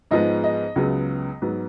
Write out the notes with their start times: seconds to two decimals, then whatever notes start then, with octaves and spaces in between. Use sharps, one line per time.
0.11 G#2 F3 G#3 B3 D#5
0.44 D#5
0.76 C#2 C#3 F#3 B3
1.42 G#2 F#3 B3